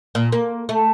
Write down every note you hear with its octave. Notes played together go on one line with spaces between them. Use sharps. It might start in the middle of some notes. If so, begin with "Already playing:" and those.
A#2
A#3
A3